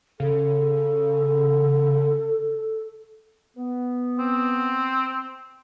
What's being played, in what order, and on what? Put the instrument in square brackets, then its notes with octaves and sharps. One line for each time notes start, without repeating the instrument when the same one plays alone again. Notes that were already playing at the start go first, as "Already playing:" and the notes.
[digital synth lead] C#3 [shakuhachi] A4
[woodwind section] B3
[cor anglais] C4